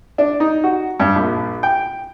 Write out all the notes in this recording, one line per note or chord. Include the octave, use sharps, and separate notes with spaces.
D4
D#4
F#4
G2
A#1
G5